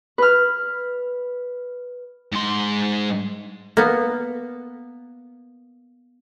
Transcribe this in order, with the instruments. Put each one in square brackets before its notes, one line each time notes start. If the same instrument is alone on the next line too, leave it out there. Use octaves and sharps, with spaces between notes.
[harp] B4 F6
[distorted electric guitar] G#2 C6
[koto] A#3 B3